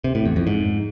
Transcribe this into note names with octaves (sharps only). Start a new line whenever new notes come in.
C3
A2
E2
F2
G#2